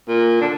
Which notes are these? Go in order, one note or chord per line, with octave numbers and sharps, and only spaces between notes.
A#2
D3